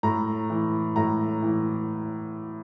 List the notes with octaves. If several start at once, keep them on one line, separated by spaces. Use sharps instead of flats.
A2 A#5
E3
A2 A#5
E3